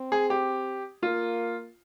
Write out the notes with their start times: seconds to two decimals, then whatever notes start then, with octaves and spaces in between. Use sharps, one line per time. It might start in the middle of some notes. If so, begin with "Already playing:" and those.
Already playing: C4
0.12 G#4
0.30 G4
1.03 A#3 F4